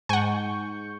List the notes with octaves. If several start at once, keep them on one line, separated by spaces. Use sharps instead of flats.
G#2 F#5 G#5 C#6 G6